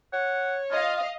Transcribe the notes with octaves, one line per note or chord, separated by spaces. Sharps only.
C#5 F#5
F4 D#5 F5